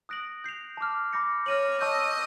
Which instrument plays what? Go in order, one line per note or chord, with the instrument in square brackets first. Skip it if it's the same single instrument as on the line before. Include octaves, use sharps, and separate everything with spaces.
[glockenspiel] D#6 F#6 A#6 D7 F#7
G6 C7 F7
A5 D6 F6
B5 D6 G6 A#6 C#7
[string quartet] C#5 [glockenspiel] F6 A#6 D#7 F#7
[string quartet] D#5 [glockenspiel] A5 C#6 E6 G6